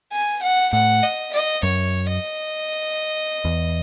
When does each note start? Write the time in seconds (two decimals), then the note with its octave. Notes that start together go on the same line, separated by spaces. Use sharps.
0.12 G#5
0.43 F#5
0.73 A2 F#5
1.03 D#5
1.33 D#5
1.63 F#2 C#5
2.09 D#5
3.45 E2